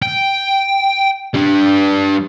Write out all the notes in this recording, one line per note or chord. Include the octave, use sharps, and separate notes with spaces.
G5
G3 D4